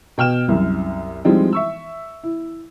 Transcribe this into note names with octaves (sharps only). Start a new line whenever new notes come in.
B2 G5 F6 E7
C2 F#2
F3 G3 G#3 C4 D#4 E4
E5 C#6 E6
E4